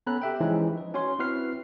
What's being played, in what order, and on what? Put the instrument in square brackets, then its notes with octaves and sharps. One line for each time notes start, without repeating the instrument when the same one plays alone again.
[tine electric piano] B3 C#4 A4 A#5 B5 F#6
G4 E5 G5
E3 F3 G#3 C#4 D#4 E4
B4
C#4 F#4 C#5 C6
C4 E4 F#4 B4 F6 C7